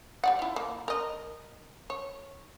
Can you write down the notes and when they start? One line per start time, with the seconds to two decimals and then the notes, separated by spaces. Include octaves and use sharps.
0.24 G3 D5 F#5
0.39 E4 F4
0.56 A#3
0.88 A#4 D#5
1.90 C#5